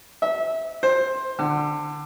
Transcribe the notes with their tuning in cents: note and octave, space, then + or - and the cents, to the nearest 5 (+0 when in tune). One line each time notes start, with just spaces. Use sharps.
E5 -25
C5 +15
D3 +15